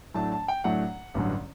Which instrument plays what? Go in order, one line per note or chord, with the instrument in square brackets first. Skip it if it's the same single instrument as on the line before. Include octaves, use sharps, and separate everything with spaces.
[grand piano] A2 F#3 A3 D4 A5
A5
G5
A2 F#3 A3 D4 F#5
A1 G2 D3 F#3